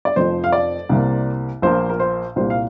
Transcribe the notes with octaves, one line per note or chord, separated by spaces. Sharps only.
D5
F1 F2 F3 C5
F5
D5
C2 C3 A#3
A#1 A#2 A#3 C5
A#4
C5
C2 A#2 G3 A#3 C5
F5